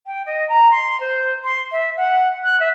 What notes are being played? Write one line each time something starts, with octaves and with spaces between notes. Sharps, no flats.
G5
D#5
A#5
C6
C5
C6
E5
F#5
F#6
E5